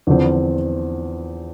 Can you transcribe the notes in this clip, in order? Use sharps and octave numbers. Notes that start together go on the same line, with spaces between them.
E2 D3 F3 C4